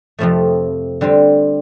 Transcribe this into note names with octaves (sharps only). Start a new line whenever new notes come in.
F2 C3 F3 A3
D3 G3 C4